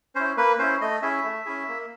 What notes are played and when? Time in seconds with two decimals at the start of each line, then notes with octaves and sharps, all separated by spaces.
0.15 C#4 E4 C5
0.37 A#3 B4
0.59 C#4 E4 C5
0.81 A3 D#5
1.02 C#4 E4 G#4 E5
1.24 A3
1.46 C#4 E4 G#4
1.68 A#3